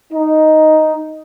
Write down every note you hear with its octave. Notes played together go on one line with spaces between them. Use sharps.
D#4